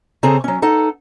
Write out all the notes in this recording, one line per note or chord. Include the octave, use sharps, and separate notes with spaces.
C#3 C4 G#4 A4 G#5 A#5
F#3 C#4
D#4 A4 F#5